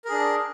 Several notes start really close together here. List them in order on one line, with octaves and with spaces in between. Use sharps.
A#4 G#4 D4